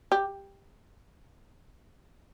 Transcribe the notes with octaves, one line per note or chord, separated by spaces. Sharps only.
G4